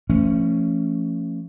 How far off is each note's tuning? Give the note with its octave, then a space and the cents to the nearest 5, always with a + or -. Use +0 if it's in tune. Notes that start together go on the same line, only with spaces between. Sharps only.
F3 -30 A3 +30 C#4 +0